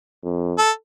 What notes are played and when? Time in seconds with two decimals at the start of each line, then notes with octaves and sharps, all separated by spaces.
0.24 F2
0.58 A4